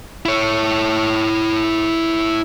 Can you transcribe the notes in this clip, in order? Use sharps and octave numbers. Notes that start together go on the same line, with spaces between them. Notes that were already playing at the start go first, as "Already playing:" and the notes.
E4 C#5